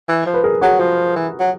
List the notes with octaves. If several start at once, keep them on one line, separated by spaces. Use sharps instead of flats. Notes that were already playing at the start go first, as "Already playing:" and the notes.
E3
F3
B4
G#4 A#4
F#3 F#4 G#4
F3
E3
F#3